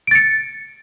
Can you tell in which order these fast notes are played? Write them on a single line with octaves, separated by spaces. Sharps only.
D7 A6 C#7